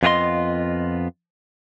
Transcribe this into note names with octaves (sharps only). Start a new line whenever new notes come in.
F2 B3 F4 G#4 D#5 C6